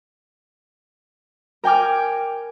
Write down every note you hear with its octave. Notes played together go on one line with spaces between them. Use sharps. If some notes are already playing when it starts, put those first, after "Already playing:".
A#4 G5 G#5 D6 F6